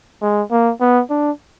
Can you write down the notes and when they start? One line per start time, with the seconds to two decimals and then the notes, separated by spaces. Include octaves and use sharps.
0.22 G#3
0.51 A#3
0.81 B3
1.10 D4